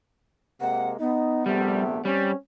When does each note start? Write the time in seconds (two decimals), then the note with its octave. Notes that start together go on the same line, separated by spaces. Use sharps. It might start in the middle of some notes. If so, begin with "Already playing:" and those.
0.61 C3 G#3 A#3 F#5
1.00 B3 D#4
1.46 A#1 C3 G3 A3
2.05 G3 C4 C#4